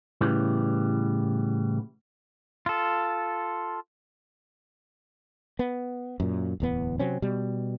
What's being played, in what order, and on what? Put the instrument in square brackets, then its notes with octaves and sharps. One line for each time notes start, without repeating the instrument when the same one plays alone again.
[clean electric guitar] A2 C#3 E3 G3 B3
[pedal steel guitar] F4 A4
[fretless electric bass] B3
F#2 A#2
D1 E2 B3
C3 F#3 C4 C#4
B2 G3